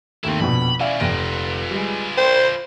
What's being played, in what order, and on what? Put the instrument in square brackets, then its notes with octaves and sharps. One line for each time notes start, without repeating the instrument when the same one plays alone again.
[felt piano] D#2 A3 [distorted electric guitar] C4 E4
[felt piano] A#1 F2 B2 [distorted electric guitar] B5
[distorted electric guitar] C#4 E4 [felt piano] D5 E5 F5
[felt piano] F1 A#6 D7 [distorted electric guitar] F4 B4
[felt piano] G3 G#3
[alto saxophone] C5 [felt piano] G5